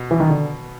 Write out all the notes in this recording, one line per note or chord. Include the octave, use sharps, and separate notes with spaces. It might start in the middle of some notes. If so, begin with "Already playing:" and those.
Already playing: B2
E3
D#3
D3